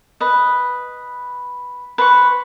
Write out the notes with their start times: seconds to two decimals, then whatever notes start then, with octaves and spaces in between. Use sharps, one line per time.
0.20 B4 D#5
1.98 B4 C5 A#5 C#6